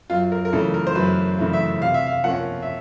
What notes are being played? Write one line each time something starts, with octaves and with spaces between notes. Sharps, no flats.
F#2 F4
A#4
A#4
C#3 E3 A3 A4
A#4
C5
F#2 B4
C#3 E3 A3
E5
C3 F5
E5
F5
F3 A#3 C#4 F#5
E5